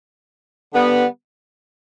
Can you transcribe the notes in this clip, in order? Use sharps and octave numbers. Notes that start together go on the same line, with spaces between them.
D3 G3 B3